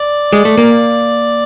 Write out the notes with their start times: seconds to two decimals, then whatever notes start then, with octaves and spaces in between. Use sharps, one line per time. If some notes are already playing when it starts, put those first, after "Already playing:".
Already playing: D5
0.33 G#3
0.45 A3
0.58 A#3